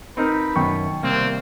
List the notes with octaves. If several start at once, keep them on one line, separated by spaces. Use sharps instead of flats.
C4 D#4 A#4 B4
F#2 B2 D#3 G5 C#6
C2 A#3 C4